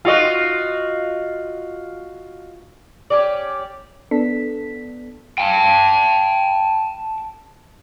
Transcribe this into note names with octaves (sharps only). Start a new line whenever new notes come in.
F4 F#4 D#5
C#4 G4 D5
B3 D4 A4 B6
G5 A5